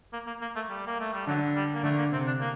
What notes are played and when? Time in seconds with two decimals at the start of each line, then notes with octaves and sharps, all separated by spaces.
0.13 A#3
0.27 A#3
0.42 A#3
0.56 A3
0.69 G3
0.87 A#3
1.00 A3
1.14 G3
1.27 D3 F#3
1.56 G3
1.74 A#3
1.84 D3 A3
1.98 A#3
2.12 C3 C4
2.27 D4
2.40 A#3